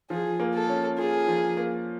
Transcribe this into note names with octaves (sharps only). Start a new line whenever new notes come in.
F3 G#4
A#3
A4
C#4
F4 G#4
F3
A#3